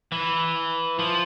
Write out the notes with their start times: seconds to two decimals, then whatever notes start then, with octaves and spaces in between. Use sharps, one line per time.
0.12 E3
0.99 F3